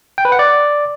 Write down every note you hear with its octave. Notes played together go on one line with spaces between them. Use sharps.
G5
B4
F#5
D5